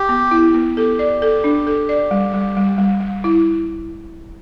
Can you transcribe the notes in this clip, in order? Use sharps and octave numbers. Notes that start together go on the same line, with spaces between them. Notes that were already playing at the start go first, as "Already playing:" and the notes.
Already playing: G4
B3
E4
B3
G4 A4
D5
A4
D4
A4
D5
G3
G3
G3
G3
G3
E4